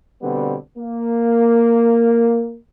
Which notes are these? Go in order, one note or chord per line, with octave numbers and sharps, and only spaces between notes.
B2 D3 G3 B3 C4
A#3